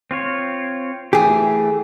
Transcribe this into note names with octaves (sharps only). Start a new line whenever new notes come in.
C4 F4 C#5
E3 A3 G4 G#4